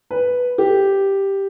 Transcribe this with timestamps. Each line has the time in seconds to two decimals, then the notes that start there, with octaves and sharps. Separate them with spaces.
0.11 B4
0.58 G4